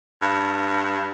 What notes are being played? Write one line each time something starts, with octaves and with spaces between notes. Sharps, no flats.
G2